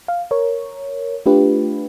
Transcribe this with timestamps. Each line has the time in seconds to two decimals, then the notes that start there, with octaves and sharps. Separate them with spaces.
0.08 F5
0.31 A#4 C#5
1.26 A3 D4 F4 G4 B4